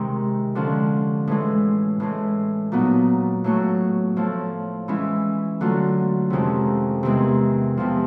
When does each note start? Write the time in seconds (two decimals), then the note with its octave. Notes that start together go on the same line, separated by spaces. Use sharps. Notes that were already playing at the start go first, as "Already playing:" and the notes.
Already playing: C3 D#3 G#3
0.55 D3 F3 G#3 C#4
1.27 A2 E3 G#3
2.00 A2 E3 G#3
2.72 A#2 F#3 B3 D#4
3.44 A2 F#3 A3
4.16 A2 F3 A3
4.88 E3 G#3 C#4 E4
5.61 D3 F#3 A3 C#4 F4
6.30 F2 C3 D#3 G#3 C#4
7.03 E2 C3 D#3 G#3
7.77 E2 C3 F3